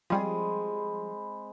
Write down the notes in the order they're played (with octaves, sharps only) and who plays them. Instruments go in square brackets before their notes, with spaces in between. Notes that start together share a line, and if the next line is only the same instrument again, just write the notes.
[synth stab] F3 G3 [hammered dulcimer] G#3 C4 [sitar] G#4 [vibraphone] B5